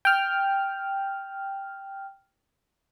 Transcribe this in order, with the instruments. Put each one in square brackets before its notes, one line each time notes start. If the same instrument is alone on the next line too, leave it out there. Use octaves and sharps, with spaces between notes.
[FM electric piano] G5 F6